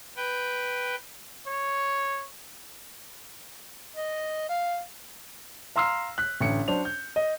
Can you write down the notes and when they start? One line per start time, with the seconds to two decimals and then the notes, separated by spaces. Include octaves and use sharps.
0.16 B4 G5
1.47 C#5
3.96 D#5
4.49 F5
5.76 F5 A#5 C6 E6 F6 C7
6.18 F#6 B6
6.41 A1 D3 C#7
6.68 F#3 D4 C5 F7
6.85 G6
7.16 D#5